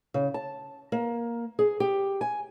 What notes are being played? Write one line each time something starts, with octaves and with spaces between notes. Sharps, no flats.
C#3
A5
A#3
G#4
G4
G#5